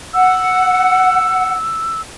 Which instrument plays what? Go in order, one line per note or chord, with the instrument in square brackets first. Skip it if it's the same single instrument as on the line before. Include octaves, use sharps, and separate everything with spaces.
[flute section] F#5 [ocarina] E6